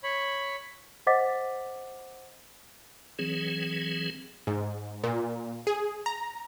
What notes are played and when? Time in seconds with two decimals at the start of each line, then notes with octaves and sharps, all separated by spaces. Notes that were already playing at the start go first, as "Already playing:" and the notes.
0.03 C#5 B5
1.07 C5 D#5 F#5 D6 A6 B6
3.19 E3 F#3 C4 G#4
4.47 G#2
5.04 A#2
5.67 G#4
6.06 A#5